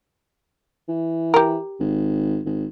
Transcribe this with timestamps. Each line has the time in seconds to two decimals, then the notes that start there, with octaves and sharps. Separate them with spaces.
0.88 E3
1.34 G4 A#4
1.80 G#1
2.46 G#1